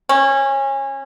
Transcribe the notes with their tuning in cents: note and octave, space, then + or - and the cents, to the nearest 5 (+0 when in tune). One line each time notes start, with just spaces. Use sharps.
C#4 -25